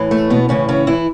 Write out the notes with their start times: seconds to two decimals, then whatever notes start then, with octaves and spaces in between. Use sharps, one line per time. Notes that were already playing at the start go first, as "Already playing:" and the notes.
Already playing: A2 E3
0.11 A3
0.30 B2 B3
0.49 A2 C#3 E3 C#4
0.68 C#3 C#4
0.87 E3 E4